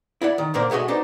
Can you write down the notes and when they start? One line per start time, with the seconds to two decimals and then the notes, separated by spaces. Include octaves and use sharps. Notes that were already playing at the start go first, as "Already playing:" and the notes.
0.22 E4 D5 F#5
0.38 D#3
0.54 A#2 D3 A#3 A#4 C5 D5
0.70 B2 G#3 A3 F#4 D#5
0.88 B3 D4 D#4 C5